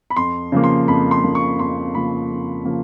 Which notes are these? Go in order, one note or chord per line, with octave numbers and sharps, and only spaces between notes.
B5
F2 C6
C#3 F3 A#3
C6
F2 B5
C6
C#3 F3 A#3
C#6
F2 C6
C#3 F3 A#3 B5
F2
C#3 F3 A#3